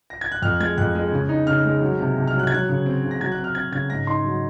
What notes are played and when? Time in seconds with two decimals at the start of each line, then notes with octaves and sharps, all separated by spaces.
0.10 A#6
0.21 G#6
0.32 F#6
0.42 F2 F6
0.60 G#3 G#6
0.78 F2 F#6
0.95 G#3
1.12 C#3
1.29 D#4
1.47 C#3 F6
1.65 G#3
1.81 F#3
1.99 C3
2.17 C3
2.28 F6
2.34 F#3
2.39 F#6
2.47 G#6
2.52 F#3 F#6
2.69 C#3
2.86 C4
3.03 C#3
3.11 A#6
3.20 F#3 G#6
3.32 F#6
3.38 C4
3.44 F6
3.55 C4 G#6
3.72 C#3 G#6
3.90 G#2 A#6
4.07 D#4 C6
4.24 F#3